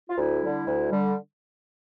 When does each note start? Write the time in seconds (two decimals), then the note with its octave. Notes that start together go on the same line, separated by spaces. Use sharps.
0.10 F4
0.18 D2 E4
0.43 D3 G3
0.66 D2
0.91 D3 G3